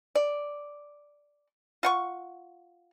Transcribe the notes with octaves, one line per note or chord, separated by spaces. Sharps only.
D5
F4 F#5 C#6